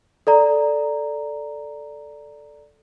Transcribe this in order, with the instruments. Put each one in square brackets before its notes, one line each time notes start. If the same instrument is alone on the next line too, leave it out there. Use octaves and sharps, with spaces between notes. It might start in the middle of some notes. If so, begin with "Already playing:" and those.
[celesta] A4 D5 A#5